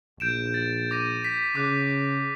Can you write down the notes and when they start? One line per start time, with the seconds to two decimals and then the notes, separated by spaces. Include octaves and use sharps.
0.20 A#1 G6 D7 E7
0.54 A6
0.91 D6 A#6 D#7
1.25 B6
1.55 C#3 D6 F#6